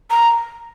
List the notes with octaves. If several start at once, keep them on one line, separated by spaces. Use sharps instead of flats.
A#5